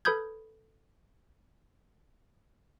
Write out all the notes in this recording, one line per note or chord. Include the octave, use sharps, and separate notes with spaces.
A4 B4 B5 D#6 G6 G#6